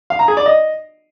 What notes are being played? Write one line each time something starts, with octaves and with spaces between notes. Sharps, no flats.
F5
A#5
G#4
D5
D#5